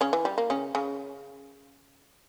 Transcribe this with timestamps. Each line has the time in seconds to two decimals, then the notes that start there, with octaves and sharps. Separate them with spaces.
0.01 C#3 C#4
0.13 E3
0.25 G3
0.38 A#3
0.50 C#3 C#4
0.75 C#3 C#4